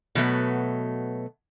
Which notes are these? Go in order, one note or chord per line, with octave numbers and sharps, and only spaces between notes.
B2 F#3 A3 B3